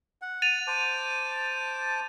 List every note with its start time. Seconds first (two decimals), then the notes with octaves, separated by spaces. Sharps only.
0.22 F#5
0.42 A6 D#7 F7
0.67 C5 A5 D6